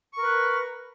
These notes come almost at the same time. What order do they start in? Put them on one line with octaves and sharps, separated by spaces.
C#6 A#4 B4